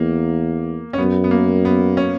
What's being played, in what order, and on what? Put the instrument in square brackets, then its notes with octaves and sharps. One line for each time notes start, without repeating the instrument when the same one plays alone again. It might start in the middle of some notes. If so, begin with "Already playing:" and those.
Already playing: [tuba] E2 [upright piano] A#3
[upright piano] C#4
[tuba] F#2 [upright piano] B3
[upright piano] B3
A#3
B3
C#4